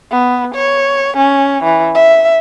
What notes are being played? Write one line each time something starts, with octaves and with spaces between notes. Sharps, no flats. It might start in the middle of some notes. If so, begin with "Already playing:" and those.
B3
C#5
C#4
E3
E5